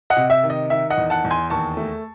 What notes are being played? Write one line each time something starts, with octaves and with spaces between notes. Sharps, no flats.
D#5 F#5
C3
E5
D#3
D#5
D#3 E5
D#5 F#5
E2
F#5 A5
E2
G#5 C6
D#2 A5 C#6
A3